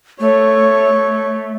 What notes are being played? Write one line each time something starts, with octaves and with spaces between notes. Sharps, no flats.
A3 C#5